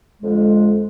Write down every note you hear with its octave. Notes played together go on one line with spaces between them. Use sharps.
F2 D3 G#3